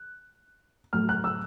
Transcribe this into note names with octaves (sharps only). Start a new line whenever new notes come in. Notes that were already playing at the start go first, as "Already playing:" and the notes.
Already playing: F#6
A2 F#3 A3 F6
F#6
E6